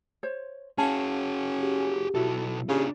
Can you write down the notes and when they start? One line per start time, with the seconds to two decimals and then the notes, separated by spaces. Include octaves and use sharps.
0.23 C5 C#5
0.78 C#4 F#4 G#4 F5 A5
1.61 G4
2.15 B1 E4 F#4 A4
2.69 C#3 D4 F4 G4